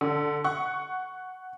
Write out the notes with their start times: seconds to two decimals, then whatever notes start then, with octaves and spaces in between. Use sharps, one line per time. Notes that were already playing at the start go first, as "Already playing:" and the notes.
0.01 D3
0.44 F#5 C#6